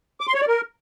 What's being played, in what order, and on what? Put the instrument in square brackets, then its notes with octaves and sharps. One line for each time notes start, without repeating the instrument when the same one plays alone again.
[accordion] D6
C6
C#5
D5
A#4